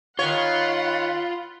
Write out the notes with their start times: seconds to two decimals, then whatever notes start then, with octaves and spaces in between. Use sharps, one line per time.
0.19 D#3 F4 C#5 F#5 B5 C6